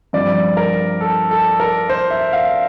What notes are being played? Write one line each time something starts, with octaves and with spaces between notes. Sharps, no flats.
G2 F3 C4 D5
A#4
A4
A4
A#4
C5
E5
F5